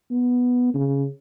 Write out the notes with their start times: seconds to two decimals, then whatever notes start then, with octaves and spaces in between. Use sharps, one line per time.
0.10 B3
0.74 C#3